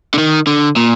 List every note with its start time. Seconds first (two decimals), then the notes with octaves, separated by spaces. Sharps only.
0.14 D3
0.18 D#3
0.47 D3
0.76 A#2